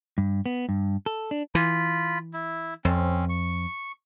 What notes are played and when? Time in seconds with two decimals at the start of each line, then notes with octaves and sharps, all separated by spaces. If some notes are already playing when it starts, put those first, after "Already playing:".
0.18 G2
0.46 B3
0.69 G2
1.06 A4
1.31 D4
1.55 E3 F4 B5
2.34 E4
2.85 F2 C4 C#4
3.29 C#6